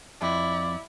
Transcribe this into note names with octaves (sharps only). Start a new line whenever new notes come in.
F2 E4 D5